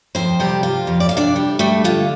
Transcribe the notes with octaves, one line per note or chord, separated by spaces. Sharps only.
F2 C4 C5
C3 G3 G4
C4 F4
F2
D5
C3 F5
D4 D5
G3
G3 A3 A4
D3 F4